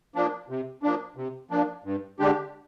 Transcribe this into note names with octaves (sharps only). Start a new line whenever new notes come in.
F3 A#3 D4
C3
F3 A#3 D4
C3
F3 A#3 D4
G2
D3 G#3 D4 G4